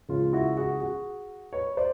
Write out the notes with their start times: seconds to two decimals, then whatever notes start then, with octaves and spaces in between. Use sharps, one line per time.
0.09 C#2 C#3 F3 F4
0.33 E4 F#4
0.57 F#4 G#4
0.80 F#4 G#4
1.53 B4 C#5
1.77 C5 D5